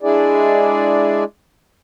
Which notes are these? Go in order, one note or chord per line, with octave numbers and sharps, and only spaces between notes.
G#3 D4 E4 G#4 D5